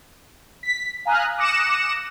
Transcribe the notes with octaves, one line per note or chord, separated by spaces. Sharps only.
B6
F5 G#5 A#5 D#6 F6 F#6
D6 D#6 F#6 A#6 C#7 E7